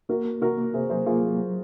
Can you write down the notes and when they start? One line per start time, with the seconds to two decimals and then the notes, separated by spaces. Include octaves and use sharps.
0.09 A#3 F#4 A#4
0.25 A#3
0.41 C3 F#4 A#4
0.58 A#3
0.74 C3 G#4 C5
0.90 F#3 G#4 C5
1.06 A#3 F4 G#4
1.22 F#3
1.39 F#3